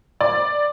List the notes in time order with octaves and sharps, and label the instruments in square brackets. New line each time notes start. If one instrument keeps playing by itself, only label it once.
[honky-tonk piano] D5